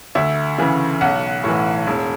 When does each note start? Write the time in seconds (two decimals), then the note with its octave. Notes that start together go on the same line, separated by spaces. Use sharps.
0.15 D2 E5
0.58 C#3 E3
1.01 B1 F#5
1.44 A2 E3
1.87 E1